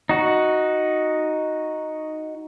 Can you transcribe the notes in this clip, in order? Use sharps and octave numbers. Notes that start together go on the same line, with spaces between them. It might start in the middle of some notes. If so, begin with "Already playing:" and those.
D#4 F#4